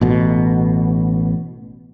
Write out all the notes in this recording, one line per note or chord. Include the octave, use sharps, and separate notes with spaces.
A1 B2